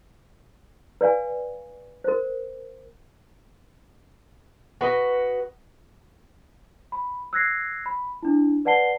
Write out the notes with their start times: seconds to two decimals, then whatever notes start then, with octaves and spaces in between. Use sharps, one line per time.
1.01 B4 D5 F5 G#5
2.04 A#4 C5
4.81 F#4 B4 D#5
6.92 B5
7.33 E6 F#6 G#6 A#6 C7
7.86 B5
8.23 D4 E4
8.65 B4 D5 F#5 A5 C7 G7